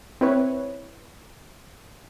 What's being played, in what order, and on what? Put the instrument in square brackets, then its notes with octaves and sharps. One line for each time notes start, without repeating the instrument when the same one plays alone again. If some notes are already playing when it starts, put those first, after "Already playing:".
[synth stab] C4 E4 B4 C#5